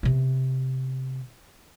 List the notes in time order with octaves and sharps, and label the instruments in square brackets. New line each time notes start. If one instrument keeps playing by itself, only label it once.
[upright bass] C3 B3